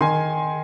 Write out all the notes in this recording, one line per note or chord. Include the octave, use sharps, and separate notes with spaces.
D#3 G#5 C6